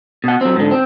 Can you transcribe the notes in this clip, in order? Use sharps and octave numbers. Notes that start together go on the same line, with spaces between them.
B2 F#5
F#3 C4
G#2 D3
C4